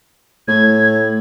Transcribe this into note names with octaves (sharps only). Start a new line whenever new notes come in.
A2 G#6